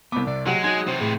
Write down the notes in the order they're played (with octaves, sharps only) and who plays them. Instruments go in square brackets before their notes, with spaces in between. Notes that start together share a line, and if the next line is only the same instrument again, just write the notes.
[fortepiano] C2 D6 [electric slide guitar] B3 C4
[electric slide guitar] C3 [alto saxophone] D5
[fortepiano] F#3 F#5 [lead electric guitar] G#3 [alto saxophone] G4
[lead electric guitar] G#3 [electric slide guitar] D#4 F#4 C#5 [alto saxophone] G#5
[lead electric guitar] C3 E3 [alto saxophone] C5
[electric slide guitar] A2 [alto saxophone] G#4